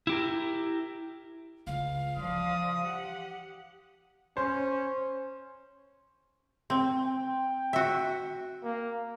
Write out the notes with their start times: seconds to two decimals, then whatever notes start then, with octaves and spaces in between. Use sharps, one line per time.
0.07 E4 G4 A#4
1.67 C#2 F5
2.17 E3 F3 D5 D#6
2.82 G4 F#5
4.37 C#4 C5
6.70 C4
7.05 G5
7.73 F#4 E5
8.64 A#3